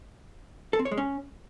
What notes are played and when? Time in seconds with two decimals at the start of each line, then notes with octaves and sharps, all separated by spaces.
0.73 A4
0.79 C4
0.85 C#5
0.91 G#3
0.98 C#4